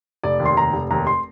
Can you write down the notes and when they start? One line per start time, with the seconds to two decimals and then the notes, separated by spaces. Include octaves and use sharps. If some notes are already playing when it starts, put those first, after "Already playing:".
0.24 F1 D5
0.40 D#2
0.46 C6
0.57 F1 A#5
0.73 F1
0.91 D#2 A#5
1.07 C6